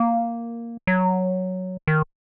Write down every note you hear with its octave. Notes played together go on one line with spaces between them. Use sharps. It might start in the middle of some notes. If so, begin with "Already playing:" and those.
Already playing: A#3
F#3
D#3